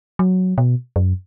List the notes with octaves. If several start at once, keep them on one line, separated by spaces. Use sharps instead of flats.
F#3
B2
F#2